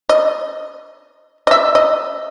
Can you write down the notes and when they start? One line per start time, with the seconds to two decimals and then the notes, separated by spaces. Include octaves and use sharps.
0.09 D#5
1.47 D#5
1.51 E5
1.75 D#5